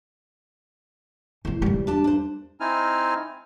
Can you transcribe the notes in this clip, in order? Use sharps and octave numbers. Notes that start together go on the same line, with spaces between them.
E2 E3 C5
E2 G3
D4 G4 A5
D4 C5
C4 D#4 E4 G#5 F6